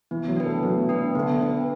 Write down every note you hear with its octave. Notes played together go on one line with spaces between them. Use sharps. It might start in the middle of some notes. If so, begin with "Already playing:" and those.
E3 B3
F#3
D4 B4
A3
F#3 B3
D4 B4
D3 B3
D4 B4